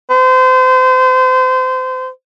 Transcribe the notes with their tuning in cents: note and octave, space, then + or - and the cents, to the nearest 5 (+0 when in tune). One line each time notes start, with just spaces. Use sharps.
C5 -30